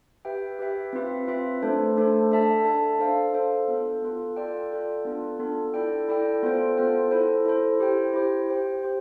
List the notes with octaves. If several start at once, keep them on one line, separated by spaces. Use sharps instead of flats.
G4 B4 E5 G5
G4 B4 E5 G5
C4 F4 B4 E5
C4 F4 B4 E5
A3 D4 A4 C5
A3 D4 A4 C5
D4 A4 E5 A5
D4 A4 E5 A5
D4 A4 C5 F5
D4 A4 C5 F5
B3 F4 A4
B3 F4 A4
F4 A4 D5 G5
F4 A4 D5 G5
B3 D4 F4 A4
B3 D4 F4 A4
E4 A4 D5 G5
E4 A4 D5 G5
B3 F4 A4 C5 G5
B3 F4 A4 C5 G5
E4 A4 C5
E4 A4 C5
E4 G4 C5 G5
E4 G4 C5 G5
G4 C5 G5
G4 C5 G5